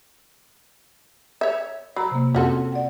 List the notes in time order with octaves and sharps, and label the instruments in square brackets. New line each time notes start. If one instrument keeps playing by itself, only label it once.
[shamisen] C#5 E5
[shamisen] F#3 [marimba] A#5 B5
[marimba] C3 A#3
[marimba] F2 C4 [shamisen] C#4 F#4 A4
[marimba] D5 F#5